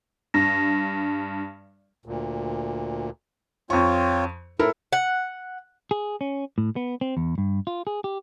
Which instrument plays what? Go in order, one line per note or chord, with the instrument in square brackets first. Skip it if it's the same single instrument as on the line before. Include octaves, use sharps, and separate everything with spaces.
[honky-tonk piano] G2 [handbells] A#6
[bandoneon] D2 A#2
[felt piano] F2 C#6 [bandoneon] C4 F4 C#5
[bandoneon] A2 [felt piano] E4 A4 A#4
[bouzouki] F#5
[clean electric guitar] G#4
C#4
A2
B3
C4
E2
G2
F4
G#4
G4